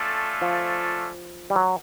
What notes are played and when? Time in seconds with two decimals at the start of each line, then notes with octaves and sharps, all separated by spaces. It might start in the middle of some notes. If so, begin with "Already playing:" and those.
Already playing: A3 C#4 F4 A4 D5
0.42 F3
1.50 G3
1.56 F#3